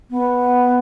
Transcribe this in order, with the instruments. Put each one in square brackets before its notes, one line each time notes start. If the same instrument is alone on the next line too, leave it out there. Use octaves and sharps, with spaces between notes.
[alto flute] B3